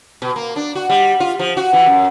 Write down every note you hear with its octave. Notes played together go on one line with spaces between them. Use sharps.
B2
A#3
D4
F#4
G3
F4
F3
F#4
E3
F#2